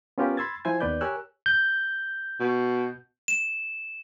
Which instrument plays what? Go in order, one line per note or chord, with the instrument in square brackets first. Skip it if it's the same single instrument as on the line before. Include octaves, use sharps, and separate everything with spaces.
[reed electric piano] B3 C#4 F4 G4 A#4 B4
B5 C6 E6 G#6 A6
F3 E4 C5 G#5 G#6
D#2 D#3 B3 B4 D5 G6
G4 A#4 C#5 G#5 E6 F#6
[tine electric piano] G6
[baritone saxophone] B2
[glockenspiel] E7